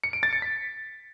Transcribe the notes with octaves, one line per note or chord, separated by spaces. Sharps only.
C#7
D7
A6
C#7
B6